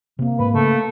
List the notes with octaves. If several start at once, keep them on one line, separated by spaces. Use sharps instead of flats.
C3 A#3 C4
G#2 B4
C#3 A3